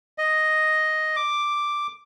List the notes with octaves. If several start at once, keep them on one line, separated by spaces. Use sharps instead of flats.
D#5
D6